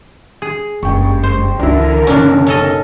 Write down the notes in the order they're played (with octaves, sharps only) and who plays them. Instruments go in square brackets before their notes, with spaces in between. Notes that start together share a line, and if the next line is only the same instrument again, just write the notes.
[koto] G#4
[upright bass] F#1 [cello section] G2 G#3 [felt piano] G5 C#6
[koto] C5
[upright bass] C#2 [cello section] D3 E3 A#4 [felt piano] D4 E4
[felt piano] F#1 B1 [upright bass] B3 [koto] C#4 D4
[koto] C#4 A4 D#5